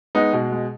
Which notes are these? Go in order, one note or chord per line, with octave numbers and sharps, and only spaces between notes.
G#3 B3 D#4
B2
G#3